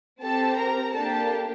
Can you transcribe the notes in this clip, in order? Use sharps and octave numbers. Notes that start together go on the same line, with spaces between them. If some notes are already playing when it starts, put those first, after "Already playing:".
C4 G4 A4 A5
A#4 A#5
A#3 D4 G4 A4 A5